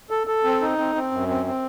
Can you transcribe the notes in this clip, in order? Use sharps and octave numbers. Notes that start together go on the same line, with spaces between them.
A4
A4
C4
D#4
C4
C4
F#2
C4
C4